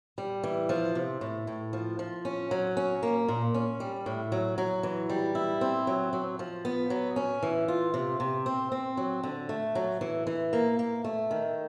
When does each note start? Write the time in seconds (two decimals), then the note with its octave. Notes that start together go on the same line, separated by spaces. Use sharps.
0.18 G3
0.43 E3
0.69 F3
0.95 C3
1.21 A2
1.47 A2
1.73 F3
1.99 F3
2.25 C#4
2.51 F#3
2.77 C#4
3.03 A#3
3.28 A#2
3.54 C#4
3.80 G3
4.06 A2
4.32 F#3
4.58 F#3
4.83 E3
5.09 G3
5.35 E4
5.61 C4
5.87 F#3
6.13 F#3
6.39 F3
6.65 B3
6.90 F#3
7.16 C#4
7.43 E3
7.68 F4
7.94 C3
8.20 C3
8.46 C4
8.72 C4
8.97 F#3
9.23 D3
9.49 A3
9.75 F#3
10.01 E3
10.27 E3
10.53 A#3
10.79 A#3
11.04 A3
11.31 D#3